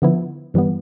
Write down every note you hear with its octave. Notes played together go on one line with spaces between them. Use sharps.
D3 F3 B3 E4
G2 E3 G3 B3